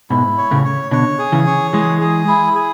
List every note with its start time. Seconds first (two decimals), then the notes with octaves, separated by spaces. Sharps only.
0.10 G#2 B2 E4
0.38 C#5
0.51 A2 C#3
0.65 C#5
0.91 B2 D3 C#5
1.19 G#4
1.32 C#3 E3
1.47 C#5
1.73 E3 G#3 G#4
2.01 G#4
2.28 E4
2.55 G#4